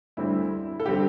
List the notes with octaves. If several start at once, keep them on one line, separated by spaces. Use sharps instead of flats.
D2 D3 G3 C4 E4
A4
D3 G3 C4 G4